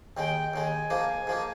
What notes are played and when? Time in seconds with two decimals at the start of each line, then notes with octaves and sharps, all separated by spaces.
0.17 D#2 D#3 G#3 G5
0.54 D#2 D#3 G#3 G#5
0.90 G#2 F3 A#3
1.27 G#2 F3 A#3